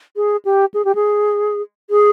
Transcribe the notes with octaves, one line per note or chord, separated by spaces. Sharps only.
G#4
G4
G#4
G4
G#4
G#4